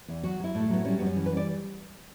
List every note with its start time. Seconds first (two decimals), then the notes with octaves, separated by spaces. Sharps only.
0.08 E2
0.23 F#3 F#4
0.40 F#3 E4
0.55 A2
0.60 A3
0.70 F#3 B3
0.85 G3 C#4
0.99 F#2 B3
1.06 C#4
1.16 E3
1.26 B4
1.32 G3
1.37 D5